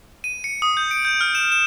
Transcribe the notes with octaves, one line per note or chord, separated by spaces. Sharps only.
D#7
C#7
D#6
G6
D7
G6
F6
E7
E7